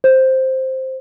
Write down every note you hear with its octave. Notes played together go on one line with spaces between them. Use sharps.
C5